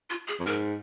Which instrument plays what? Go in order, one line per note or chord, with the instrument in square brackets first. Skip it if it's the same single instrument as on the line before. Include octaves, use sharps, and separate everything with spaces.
[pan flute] F4
G#4
[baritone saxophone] F2
[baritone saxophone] G#2 [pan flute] A#4